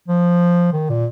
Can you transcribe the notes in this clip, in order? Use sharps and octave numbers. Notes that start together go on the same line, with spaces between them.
F3
D#3
A#2